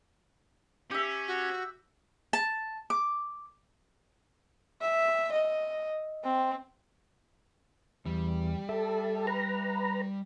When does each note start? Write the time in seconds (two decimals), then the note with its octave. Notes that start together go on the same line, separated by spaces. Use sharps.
0.91 C#4 G4 E5
1.28 F#4
2.33 A5
2.90 D6
4.81 E5
5.32 D#5
6.24 C4
8.06 E2 G3
8.69 A4 E5
9.27 B4 A#5